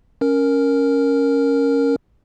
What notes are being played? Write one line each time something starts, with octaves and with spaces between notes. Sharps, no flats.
C#4 A#4